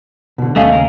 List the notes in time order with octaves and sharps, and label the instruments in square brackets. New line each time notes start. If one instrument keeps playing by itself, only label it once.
[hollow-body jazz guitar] B2 D3
[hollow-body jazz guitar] D#2 D#5 F5 [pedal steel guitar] A3 C#4
[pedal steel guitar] C#3 A#4